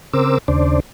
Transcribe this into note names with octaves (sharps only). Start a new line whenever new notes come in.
C#3 C4 A#4 C5 D6 E6
D#2 C#3 D4 C5 D5